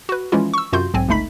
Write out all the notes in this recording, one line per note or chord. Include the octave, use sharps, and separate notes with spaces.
F#4 B4
E3 F3 G#3 C#4 E4 F4
C#6 E6
F#2 C3 F4 F#4 C6 G6
B1 G#2 C4 G#5
G1 C#2 A3 D#4 B5 B6